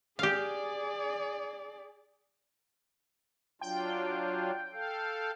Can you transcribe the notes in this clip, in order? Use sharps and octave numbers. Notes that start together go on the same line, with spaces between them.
G4 G#4 D5 F5
F#3 D4 F4 G5
A4 F5